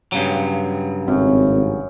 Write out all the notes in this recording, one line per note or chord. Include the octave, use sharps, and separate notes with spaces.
G2 C#3 F#3
G#1 F#2 C4